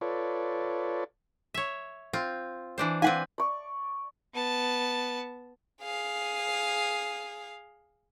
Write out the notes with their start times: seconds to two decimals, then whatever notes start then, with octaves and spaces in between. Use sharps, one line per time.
0.01 F4 A4 B4 C#5 D5
1.54 C#5 E5
2.13 C4 F4
2.78 E3 D4 C5
3.02 C4 B4 F5 F#5 G#5
3.38 D5 C#6
4.34 B3 A5
5.82 G#4 F5